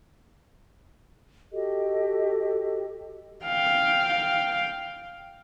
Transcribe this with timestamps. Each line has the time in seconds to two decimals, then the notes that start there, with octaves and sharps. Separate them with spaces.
1.52 F#4 G4 A4 D#5
3.45 F5 G5